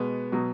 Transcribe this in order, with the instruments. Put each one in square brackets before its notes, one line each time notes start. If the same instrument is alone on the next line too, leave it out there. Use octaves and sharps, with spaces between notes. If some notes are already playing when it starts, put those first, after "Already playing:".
Already playing: [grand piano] B2 G#3 B3
B2 F#3